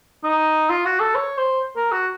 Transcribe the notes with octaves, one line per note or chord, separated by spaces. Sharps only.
D#4
F4
F#4
A4
C#5
C5
A#4
F#4